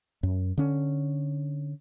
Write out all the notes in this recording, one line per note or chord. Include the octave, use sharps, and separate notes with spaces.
F#2
D3 C#4